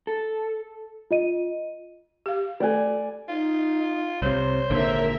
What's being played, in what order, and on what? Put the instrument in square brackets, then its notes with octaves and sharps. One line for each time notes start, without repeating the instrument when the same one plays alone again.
[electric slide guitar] A4
[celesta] F4 D#5 D#7
[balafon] G4 F5
[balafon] A3 A4 [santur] D5 G#5
[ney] D#4 [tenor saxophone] F4
[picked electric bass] C2 C3 [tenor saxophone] C5 [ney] C#5
[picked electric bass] G#1 A#2 D3 [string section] A#4 E5